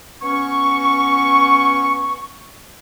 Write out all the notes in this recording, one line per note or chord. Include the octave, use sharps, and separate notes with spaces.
B3 C#4 C#6